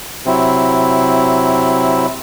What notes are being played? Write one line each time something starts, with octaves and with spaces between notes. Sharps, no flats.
C3 F#3 C4 E4